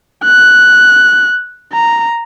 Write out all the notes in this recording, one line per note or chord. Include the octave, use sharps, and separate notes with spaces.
F#6
A#5